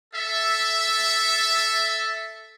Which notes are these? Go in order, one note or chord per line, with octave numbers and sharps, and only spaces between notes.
A4 E5